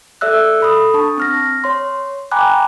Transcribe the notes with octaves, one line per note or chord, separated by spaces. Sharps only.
A4 D5 E5 E6 F#6
A4 B5 D#6
D4 A5 C#6
C4 F6 A#6
C#5 C6
G5 G#5 A#5 B5 D6 F#6